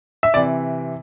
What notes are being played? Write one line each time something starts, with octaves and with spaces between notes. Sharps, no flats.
E5
C3 E3 D5